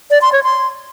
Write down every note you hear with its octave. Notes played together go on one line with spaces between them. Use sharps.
D5
C6
C#5
C6